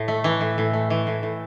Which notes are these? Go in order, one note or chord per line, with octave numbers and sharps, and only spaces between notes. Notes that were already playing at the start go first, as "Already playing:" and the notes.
Already playing: A2
A3
E3
A2
A2
A3
E3
A2
A2